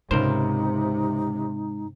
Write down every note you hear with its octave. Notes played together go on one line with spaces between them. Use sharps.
C#2 G#2 C3 D#4 A#4 C5